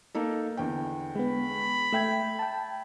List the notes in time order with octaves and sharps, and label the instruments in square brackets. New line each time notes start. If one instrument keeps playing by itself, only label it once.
[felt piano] A#3 D#4 A4
E2 D3 G5
[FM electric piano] G#3 B3 [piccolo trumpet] B5
[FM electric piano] A3 G5 [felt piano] E5 G#6
[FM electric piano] G5 A5